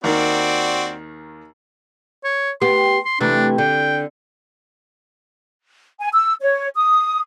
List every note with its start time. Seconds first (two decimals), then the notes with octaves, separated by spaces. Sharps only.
0.04 D#2 D#3 C4 F#4 D5
2.24 C#5
2.62 B3 G4 C6
3.05 C6
3.20 C3 E3 A3 D4
3.58 D3 G5
6.00 G#5
6.13 E6
6.41 C#5
6.76 D#6